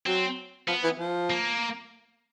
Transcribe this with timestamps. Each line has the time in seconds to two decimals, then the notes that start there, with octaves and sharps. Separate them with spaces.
0.06 F#3 C4
0.68 F3 B3
0.84 E3
0.99 F3
1.30 A#3